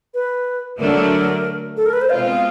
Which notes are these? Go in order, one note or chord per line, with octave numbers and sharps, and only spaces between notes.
B4
D3 F#3 A3 D4 A#4
A4
A#4
B4
C5
B2 G#3 C4 F4 F5